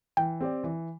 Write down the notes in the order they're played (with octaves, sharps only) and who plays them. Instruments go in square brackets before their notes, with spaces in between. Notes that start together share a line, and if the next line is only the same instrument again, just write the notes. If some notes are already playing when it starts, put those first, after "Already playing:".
[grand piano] E3 [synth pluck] G5
[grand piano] C4 G4 D5
E3